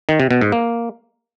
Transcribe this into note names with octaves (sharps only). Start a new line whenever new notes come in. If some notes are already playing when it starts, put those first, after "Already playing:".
D#3
C3
B2
G#2
A#3